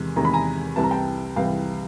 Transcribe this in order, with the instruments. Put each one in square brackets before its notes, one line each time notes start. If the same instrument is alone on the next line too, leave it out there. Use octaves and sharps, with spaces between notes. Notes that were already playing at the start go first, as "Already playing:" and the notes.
Already playing: [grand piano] E2 C3 D#3 G#3
E2 C3 D#3 G#3 A#5
B5
G#5 A#5
C2 C3 E3 A5
A#5
G5 A5
C2 C3 E3 F5 G5